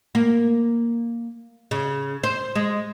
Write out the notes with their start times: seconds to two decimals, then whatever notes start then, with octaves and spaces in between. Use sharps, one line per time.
0.15 A#3
1.71 C#3
2.23 C5
2.55 G#3